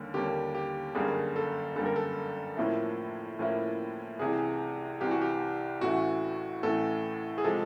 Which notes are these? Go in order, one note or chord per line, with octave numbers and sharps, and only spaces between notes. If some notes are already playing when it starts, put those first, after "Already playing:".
Already playing: D#2 D3 G3 A#3 C#4
D#2 D3 G3 A#3 C#4 G4
G4
G1 F#2 D3 G3 A#3 G#4
A4
G1 F#2 D3 G3 A#3 A4
A#4
A4
A2 F3 A#3 C#4 E4
A2 F3 A#3 C#4 E4
C2 C3 E3 G#4
C2 C3 E3 G4
F#4
G4
A1 A2 E3 A3 F#4
A1 A2 E3 A3 A4
G#4
C3 F3 G#3 A4